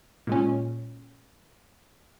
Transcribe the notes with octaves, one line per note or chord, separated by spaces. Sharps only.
A#2 G#3 C#4